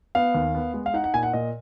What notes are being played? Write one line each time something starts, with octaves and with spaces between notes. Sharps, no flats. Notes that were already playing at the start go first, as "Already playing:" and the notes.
B3 F5
D#2
B3
G#3
F5
D#4 F#5
F#5
A#2 G#5
F#5
A#2 D#5